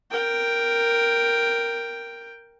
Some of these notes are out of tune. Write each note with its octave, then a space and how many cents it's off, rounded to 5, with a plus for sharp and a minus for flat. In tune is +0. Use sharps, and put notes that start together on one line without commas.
A#4 +0 G5 +0